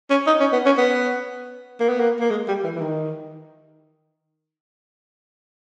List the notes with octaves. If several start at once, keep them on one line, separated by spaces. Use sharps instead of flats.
C#4
D#4
C#4
B3
C#4
B3
A#3
B3
A#3
A#3
G#3
G3
E3
E3
D#3